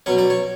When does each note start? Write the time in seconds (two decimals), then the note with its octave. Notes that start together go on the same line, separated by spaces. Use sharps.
0.06 B2 F#3 C#4 C#5
0.18 D5
0.30 C#5